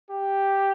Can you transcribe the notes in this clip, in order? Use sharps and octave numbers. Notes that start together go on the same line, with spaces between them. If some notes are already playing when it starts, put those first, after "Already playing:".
G4